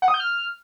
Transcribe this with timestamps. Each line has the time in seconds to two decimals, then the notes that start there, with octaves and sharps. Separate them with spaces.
0.02 F#5
0.08 D#6
0.14 G6
0.20 F6